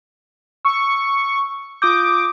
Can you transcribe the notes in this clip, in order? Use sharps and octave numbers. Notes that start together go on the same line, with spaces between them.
C#6 E6
F4 D6 D#6 G6